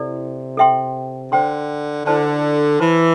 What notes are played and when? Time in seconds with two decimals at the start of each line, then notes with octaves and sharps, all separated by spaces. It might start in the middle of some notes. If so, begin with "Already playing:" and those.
Already playing: C3 E4 A4 D5
0.57 A4 E5 G5 C6
1.31 D3 C5 G5 C6
2.05 D3 E4 C5 A5 C6
2.80 E3 C5 A5 C6